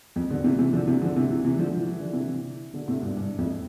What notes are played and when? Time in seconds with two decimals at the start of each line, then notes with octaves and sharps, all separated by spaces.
0.16 F2
0.30 B2 D3
0.44 C3 E3
0.58 C3 E3
0.73 D3 F3
0.87 C3 E3
1.01 D3 F3
1.16 C3 E3
1.30 C3 E3
1.44 C3 E3
1.59 D3 F3
1.73 F3
1.87 E3
2.00 D3
2.13 C3 E3
2.73 B2 D3
2.88 A2 C3
3.02 G2 B2
3.17 G2
3.38 F2 A2